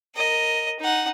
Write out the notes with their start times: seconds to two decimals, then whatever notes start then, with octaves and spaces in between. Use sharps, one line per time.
0.15 A#4 D#5
0.80 D#4 F#5